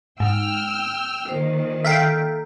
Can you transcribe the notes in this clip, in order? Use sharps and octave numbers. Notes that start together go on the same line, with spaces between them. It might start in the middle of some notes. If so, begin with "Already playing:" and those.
G#2 G5 E6 F6
A#2 D#3 C5
A4 E5 F5 G5 A#5